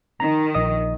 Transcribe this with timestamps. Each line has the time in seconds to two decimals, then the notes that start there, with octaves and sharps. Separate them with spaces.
0.20 D#3 A#5
0.55 A#1 D#5 D#6